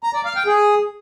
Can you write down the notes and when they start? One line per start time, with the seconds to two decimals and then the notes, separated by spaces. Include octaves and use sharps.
0.03 A#5
0.14 D5
0.25 F5
0.36 G5
0.46 G#4